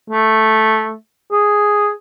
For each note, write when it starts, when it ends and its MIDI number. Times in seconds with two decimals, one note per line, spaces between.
0.10 0.95 57
1.31 1.91 68